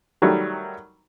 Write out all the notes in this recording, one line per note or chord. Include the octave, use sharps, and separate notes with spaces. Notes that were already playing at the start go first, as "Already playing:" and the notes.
D#3 F#3 G3 A3